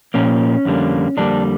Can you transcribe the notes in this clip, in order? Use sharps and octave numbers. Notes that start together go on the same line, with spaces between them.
A#2 F3 A#3 C#4
F2 D3 G3 A#3
F2 D3 G3 A#3 D4